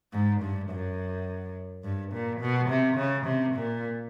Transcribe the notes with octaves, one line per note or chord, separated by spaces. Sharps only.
G#2
G2
F#2
G2
A#2
B2
C3
C#3
C3
A#2